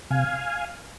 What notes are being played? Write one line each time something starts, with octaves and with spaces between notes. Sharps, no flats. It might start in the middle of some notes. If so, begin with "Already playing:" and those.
C3 F5 G#5